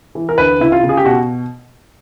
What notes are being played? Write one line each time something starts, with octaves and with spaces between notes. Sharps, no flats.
E3
A#4
D2 B4
C#3 E4
F4
C#3
G#4
G4
B2 F#4